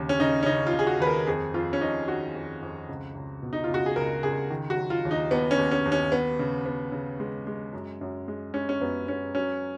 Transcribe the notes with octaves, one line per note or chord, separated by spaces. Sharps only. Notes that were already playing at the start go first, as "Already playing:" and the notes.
Already playing: D#2 C#3
C#4
C#3 D#4
C#4
C#3 D#4
F4
C#3
G#4
F#4
D#2 B4
A#4
F2 G#4
F2 F4
C#4
F2 D#4
D#3 F#4
F2
F2
C#2
C#2
B2
D#4
F4
C#2 F#4
G#4
C#2 A#4
C#2 G#4
D#3
F#4
F#3
F4
D#2
D#4
D#2 B3
C#4
D#2
C#4
D#2
C#4
B3
C#3
B3
C#3
G#3
G#3
F#2
F#2
G#3
G#3 C#4
C#4
F#2 B3
B3 C#4
F#3 C#4